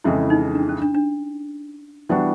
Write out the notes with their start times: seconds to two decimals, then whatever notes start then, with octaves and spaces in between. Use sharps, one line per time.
0.04 F2 C#3 E3 G#3 E4
0.30 D#4
0.55 D4
0.69 C#4
0.82 D4
0.95 D4
2.09 E3 G3 B3 D4 E4 F#4